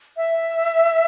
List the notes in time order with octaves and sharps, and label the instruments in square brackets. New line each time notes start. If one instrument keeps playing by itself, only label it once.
[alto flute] E5